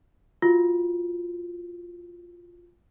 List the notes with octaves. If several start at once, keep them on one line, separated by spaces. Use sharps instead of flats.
F4 F#4